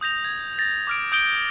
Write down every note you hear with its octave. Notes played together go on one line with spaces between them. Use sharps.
D#6 G6 A#6 F7
G#6
A6 A#6
D6 F6 D7
D#6 G6 D7 G7